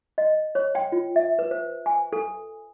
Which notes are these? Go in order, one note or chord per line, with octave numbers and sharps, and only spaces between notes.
D#5
C#5
G5
F4
E5
B4
C5
G#5
A4